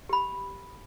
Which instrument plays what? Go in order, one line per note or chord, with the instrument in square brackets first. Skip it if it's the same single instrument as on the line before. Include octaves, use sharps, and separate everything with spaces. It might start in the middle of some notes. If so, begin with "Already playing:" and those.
[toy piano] G4 B5